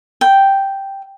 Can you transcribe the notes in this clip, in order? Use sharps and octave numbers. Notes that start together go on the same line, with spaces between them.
G5